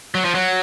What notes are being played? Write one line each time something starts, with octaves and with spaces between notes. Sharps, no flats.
F#3
F3
F#3